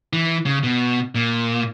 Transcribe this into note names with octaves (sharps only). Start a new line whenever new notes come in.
E3
C#3
B2
A#2